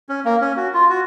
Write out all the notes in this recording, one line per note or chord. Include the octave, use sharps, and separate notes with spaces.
C#4
A#3
C#4
F#4
F4
F#4